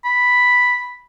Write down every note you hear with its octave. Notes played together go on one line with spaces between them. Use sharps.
B5